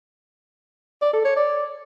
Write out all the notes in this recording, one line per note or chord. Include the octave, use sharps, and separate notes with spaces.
D5
A4
C#5
D5